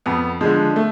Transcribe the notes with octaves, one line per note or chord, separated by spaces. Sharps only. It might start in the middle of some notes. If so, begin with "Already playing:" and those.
F2 B3
D3 F3 G#3
A3